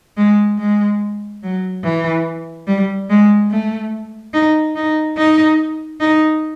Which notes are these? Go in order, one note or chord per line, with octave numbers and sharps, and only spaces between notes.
G#3
G#3
F#3
E3
G3
G#3
A3
D#4
D#4
D#4
D#4